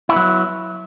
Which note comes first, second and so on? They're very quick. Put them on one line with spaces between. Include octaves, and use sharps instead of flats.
E4 B3 F#3